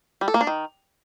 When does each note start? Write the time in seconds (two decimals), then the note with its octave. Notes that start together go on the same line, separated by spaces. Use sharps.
0.21 G3
0.28 A4
0.34 A#3
0.41 D4
0.47 D#3